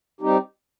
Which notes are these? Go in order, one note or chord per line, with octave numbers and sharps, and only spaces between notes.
G3 C4 D#4 G4